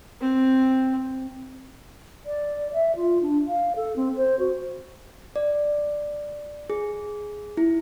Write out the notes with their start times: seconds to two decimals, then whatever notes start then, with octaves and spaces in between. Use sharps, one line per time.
0.21 C4
2.26 D5
2.73 E5
2.96 F4
3.22 D4
3.48 F5
3.76 A4
3.96 C4
4.16 C5
4.39 F#4
5.36 D5
6.70 G#4
7.57 E4